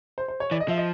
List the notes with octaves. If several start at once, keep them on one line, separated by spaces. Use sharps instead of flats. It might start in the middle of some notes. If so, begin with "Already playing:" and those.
C5
C5
C#5
E3 D5
D#5
F3 E5
D#5